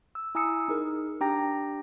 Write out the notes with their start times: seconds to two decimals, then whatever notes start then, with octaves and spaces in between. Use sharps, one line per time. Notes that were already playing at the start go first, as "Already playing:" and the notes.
0.15 E6
0.35 E4 G#5 A#5 D#6 E6 C#7
0.68 D#4 G#4 A#4
1.21 D4 G4 G5 A#5 A#6